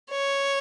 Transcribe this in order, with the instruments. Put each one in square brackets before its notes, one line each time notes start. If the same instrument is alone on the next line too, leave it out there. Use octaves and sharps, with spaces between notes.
[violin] C#5